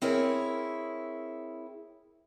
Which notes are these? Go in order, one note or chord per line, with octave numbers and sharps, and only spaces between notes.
C4 E4 G#4 A#4 C#5